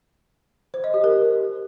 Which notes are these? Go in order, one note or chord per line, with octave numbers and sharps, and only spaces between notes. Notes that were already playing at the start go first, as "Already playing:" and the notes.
C5
D#5
G4
A#4